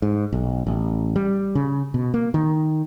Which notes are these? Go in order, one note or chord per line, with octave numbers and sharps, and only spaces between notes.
G#2
B1
A1
G3
C#3
B2
A#3
D#3